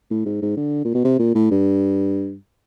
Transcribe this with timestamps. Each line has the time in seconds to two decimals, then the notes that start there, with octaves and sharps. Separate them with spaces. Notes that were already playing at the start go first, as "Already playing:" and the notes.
0.11 A2
0.26 G#2
0.42 G#2
0.57 D3
0.85 A#2
0.94 B2
1.04 C3
1.19 A#2
1.35 A2
1.51 G2